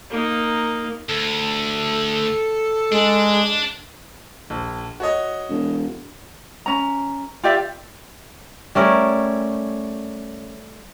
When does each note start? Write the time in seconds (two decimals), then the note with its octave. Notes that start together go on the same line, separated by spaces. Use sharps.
0.10 A#3 D#4
1.09 D2 A4
2.92 G#3 D4
4.50 A#1
5.00 F#4 C#5 D#5
5.50 E1
6.66 C#4 A#5
7.43 F4 G4 D5 E5
8.75 G3 A3 C#4 A#4